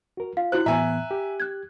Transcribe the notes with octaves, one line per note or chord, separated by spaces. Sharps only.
F#4 A#4
F4 F5
E4 F#4 C5 F#6
A2 E3 B3 E5 G#5 A#5
G4
F#6 G#6